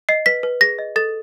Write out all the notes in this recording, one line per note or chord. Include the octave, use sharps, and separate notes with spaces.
D#5 C7
B4 B6
B4
G#4 A#6
D#5
A4 A6